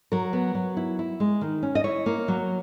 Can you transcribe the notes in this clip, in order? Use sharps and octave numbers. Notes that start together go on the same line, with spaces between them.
F#3 A#4
B3
F#3
E4
E4
G#3
D#3
C#4
D#5
E4 C#5
A#3
F#3